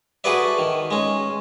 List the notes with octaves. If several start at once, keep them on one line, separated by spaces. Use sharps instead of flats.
F#4 G#4 A4 B4 D5 E5
D#3
G#3 C#4